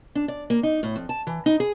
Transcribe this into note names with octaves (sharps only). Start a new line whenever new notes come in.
D4
D5
A#3
D#4
A2
F2
A5
E3
D#4
G#4